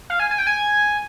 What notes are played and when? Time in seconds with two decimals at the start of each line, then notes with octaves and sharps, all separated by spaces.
0.10 F5
0.20 G#5
0.31 G#5
0.38 G5
0.47 G#5